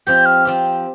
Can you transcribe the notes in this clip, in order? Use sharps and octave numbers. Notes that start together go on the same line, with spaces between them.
F3 C4 G4 G6
F6
F3 C4 G4